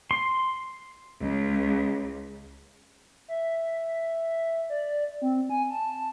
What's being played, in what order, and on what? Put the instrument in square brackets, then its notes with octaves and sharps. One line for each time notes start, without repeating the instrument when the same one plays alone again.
[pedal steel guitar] C6
[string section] C#2
[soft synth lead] E5
D5
C4
G#5
A5